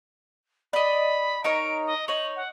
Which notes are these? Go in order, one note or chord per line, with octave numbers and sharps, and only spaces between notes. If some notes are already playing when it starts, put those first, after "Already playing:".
D5 D#5 B5
D#4 A#4 C#5 D7
D#5
D#4 C#5 F#7
F#5